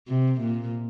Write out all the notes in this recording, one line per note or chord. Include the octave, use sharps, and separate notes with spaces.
C3
A#2